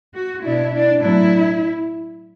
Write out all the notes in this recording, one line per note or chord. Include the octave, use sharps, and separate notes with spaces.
F#4
B2 B3 D4 E4
D4
A2 F#3 B3 D4 E4